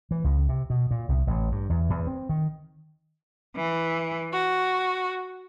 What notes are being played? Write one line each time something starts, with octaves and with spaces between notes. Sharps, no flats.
E3
C#2
C3
B2
A#2
C2
A1
G2
E2
E2
C4
D#3
E3
F#4